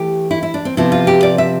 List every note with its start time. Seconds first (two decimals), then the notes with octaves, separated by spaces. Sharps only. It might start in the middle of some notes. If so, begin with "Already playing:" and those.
Already playing: E3 A3 G4
0.31 E4
0.43 E4
0.54 D4
0.65 C4
0.77 C3 F3 B3 E4
0.92 F4
1.07 G4
1.23 D5
1.38 E5